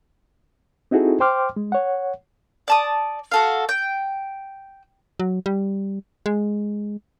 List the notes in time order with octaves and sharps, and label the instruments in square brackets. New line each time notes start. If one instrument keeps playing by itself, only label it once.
[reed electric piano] C4 D#4 E4 F#4 G#4 A4
C5 G5 C6 D6 F6
G#3
C#5 F#5
[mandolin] D5 A5 D#6
F#4 A4 F5
G5
[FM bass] F#3
G3
G#3